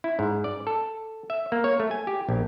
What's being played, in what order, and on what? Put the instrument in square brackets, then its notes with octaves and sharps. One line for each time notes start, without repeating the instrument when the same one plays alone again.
[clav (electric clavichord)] E4
G#2
D5
A4
E5
A#3
C#5
A3
G#5
G4
A#1